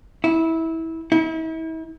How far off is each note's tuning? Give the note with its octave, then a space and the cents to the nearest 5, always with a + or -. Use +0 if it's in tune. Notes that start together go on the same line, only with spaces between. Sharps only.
E4 -20
E4 -40